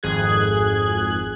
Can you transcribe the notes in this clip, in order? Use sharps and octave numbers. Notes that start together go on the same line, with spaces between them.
G#1 F2 G#4 F#6 G#6